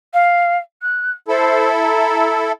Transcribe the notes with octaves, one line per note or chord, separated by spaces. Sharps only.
F5
F#6
E4 A4 C5
A#5